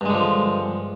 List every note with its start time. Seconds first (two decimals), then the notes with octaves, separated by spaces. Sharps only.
0.01 G2
0.05 G#3
0.10 D3
0.14 F3